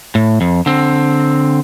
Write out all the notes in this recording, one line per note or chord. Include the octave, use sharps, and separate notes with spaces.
A2
F2
D3 C4